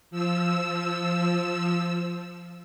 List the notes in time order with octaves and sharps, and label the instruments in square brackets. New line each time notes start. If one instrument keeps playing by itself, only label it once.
[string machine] F3 E6